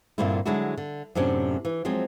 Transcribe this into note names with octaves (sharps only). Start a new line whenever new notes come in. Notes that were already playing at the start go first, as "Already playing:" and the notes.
G2 A#2 D3 A#3 C4 E4
D3 F#3 G#3 D4 E4 F#4
D3
F#2 A2 C3 C#4 D4
E3
F3 F#3 G#3 C4